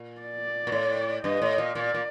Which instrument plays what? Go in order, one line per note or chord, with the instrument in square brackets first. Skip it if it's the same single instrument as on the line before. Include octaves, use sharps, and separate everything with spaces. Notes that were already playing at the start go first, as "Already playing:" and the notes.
Already playing: [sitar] A#2
[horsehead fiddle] D5
[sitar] A#2
A2
[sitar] G2 [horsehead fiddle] D#5
[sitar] A2
A#2
[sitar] A#2 [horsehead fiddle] D5
[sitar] A#2